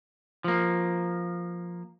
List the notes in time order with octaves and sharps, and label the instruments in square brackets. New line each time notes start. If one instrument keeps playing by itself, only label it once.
[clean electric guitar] F3 A#3